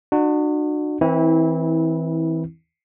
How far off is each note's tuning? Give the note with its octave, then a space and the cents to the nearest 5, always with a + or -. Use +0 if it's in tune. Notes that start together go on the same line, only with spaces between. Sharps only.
D4 +40 F#4 -15
E3 -30 C4 +0 E4 -20